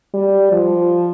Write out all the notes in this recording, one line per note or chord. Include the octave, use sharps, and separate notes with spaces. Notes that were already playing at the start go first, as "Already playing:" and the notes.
G3
F3